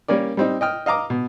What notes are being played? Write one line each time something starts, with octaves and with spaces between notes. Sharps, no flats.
G3 A#3 C#4 A#4 D5
G3 C4 D#4
D#5 G5 F6
D#5 F5 A#5 D6
B2